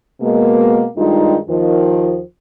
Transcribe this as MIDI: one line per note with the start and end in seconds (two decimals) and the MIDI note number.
0.21 0.86 47
0.21 0.86 56
0.21 0.86 58
0.97 1.38 43
0.97 1.38 51
0.97 1.38 55
0.97 1.38 56
0.97 1.38 63
0.97 1.38 65
1.48 2.20 39
1.48 2.20 51
1.48 2.20 53